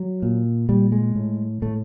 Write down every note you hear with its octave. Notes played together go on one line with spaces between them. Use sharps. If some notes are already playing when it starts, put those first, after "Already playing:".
Already playing: F#3
A#2
A#2 G3
G#3
A2
A2 A3